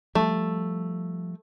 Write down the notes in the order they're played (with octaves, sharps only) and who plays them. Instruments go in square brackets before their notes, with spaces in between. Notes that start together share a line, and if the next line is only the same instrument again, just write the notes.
[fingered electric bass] F3 G3 [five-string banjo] A3